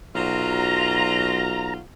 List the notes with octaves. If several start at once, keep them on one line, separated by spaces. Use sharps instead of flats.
B1 F#3 F4 A#5